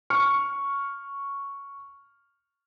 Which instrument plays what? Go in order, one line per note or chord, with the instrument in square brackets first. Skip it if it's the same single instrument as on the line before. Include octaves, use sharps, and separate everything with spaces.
[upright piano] C#6 F6 C#7